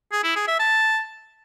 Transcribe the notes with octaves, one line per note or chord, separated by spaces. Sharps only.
G#4
E4
G#4
E5
A5